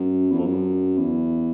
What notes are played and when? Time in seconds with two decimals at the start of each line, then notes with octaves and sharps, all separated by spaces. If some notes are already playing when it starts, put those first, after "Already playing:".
Already playing: F#2
0.31 E2
0.39 F2
0.46 F#2
0.98 E2